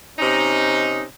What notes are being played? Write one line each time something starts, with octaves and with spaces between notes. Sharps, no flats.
C3 C#4 D#4